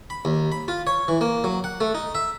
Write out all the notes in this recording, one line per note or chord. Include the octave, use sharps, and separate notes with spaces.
B5
D#2
B5
F4
C#5
E3
A#3
F#3
F#5
A3
D#4
E5